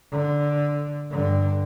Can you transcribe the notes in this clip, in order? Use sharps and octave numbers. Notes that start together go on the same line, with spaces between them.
D3
G2 D3